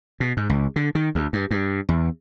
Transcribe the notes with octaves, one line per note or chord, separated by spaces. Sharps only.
B2
G#2
C#2
D3
D#3
D2
G2
G2
E2